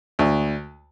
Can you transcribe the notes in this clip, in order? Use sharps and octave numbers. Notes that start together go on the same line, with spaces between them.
D2